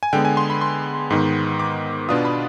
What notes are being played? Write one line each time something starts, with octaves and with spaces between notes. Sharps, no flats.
G#5
D3 G#3 B3 G5
G#5
C6
B5
C6
G#2 D#3 B3
D6
B2 B3 D4 F4 D#6
B5